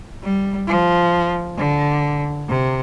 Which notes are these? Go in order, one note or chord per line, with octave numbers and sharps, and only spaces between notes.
G3
F3
D3
C3